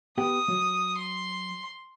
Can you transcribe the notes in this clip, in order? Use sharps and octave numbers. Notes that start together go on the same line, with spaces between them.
B3 G4 G5 D#6
F#3
C6